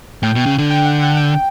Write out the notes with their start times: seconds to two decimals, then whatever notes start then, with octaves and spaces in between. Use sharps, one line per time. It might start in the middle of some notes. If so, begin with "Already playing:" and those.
0.23 A2 G5
0.35 B2
0.46 C#3
0.58 D3
0.70 G5
0.86 F#5
1.02 F#5
1.17 G5